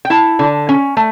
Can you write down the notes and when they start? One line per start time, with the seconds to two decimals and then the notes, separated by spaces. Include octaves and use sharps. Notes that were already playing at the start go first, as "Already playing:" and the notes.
0.05 G5
0.10 E4 A5
0.39 D3
0.69 C#4
0.97 A3